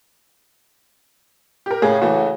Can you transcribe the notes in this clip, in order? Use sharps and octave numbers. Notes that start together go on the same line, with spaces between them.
G4 A#4
A2 C#3 G#4
E3 A3 F#4